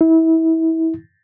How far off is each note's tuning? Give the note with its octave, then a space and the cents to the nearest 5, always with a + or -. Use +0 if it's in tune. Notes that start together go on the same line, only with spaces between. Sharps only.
E4 -30